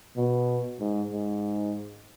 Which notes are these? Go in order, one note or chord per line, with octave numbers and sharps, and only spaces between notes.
B2
G#2
G#2